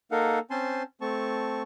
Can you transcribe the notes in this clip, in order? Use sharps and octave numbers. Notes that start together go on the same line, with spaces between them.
A#3 D#4 A4 A#4 F5 F#5
C4 C#4 C5 G#5 A5 C6
A3 C4 A5 C#6